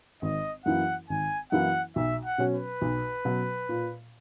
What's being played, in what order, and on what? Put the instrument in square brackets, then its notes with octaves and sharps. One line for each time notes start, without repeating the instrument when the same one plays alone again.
[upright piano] G#1 [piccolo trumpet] D#5
[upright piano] F#2 E3 A#3 E4 [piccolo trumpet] F#5
[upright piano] G#1 [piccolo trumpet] G#5
[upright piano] F#2 E3 A#3 E4 [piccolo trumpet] F#5
[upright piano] B1 [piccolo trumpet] E5
[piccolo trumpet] F#5
[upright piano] B2 F#3 C#4
[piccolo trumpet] B4
[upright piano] B1
B2 F#3 C#4
A#2